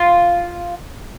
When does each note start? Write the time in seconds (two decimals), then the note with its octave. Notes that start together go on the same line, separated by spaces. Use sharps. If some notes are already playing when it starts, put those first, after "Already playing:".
Already playing: F4